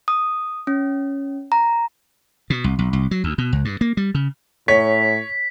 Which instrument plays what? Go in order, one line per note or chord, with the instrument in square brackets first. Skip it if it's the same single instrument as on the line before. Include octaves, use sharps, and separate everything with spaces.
[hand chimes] D#6
C#4
A#5
[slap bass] B2
C2
B1
C2
F#3
D2
B2
C#2
G2
A#3
G3
C#3
[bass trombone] A2 [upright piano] C#5 [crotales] B6